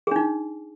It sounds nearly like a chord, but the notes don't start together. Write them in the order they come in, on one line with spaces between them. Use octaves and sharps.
G#4 D4 D#4